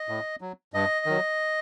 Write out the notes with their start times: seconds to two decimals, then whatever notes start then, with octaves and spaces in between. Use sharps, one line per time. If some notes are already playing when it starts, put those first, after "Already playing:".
Already playing: D#5
0.09 A2
0.41 F#3
0.74 G2 D#5
1.06 D#3 F#3